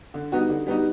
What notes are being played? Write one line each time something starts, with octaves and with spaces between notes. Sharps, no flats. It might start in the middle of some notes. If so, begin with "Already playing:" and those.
D3
G3 B3 D#4 F#4
D3
G3 B3 D#4 F#4